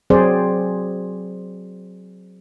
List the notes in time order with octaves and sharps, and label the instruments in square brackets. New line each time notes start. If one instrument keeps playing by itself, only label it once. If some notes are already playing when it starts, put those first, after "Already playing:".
[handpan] F#3 C4 G#4 C5 D5